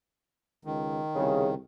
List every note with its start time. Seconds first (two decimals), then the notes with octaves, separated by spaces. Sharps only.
0.65 C#2 D#3
1.15 C2 C#3